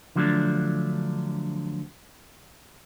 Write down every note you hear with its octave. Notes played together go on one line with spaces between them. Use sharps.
D3 F3 F#3 A3 D4